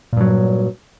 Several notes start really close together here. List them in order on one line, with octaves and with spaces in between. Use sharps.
A#2 G2 F#3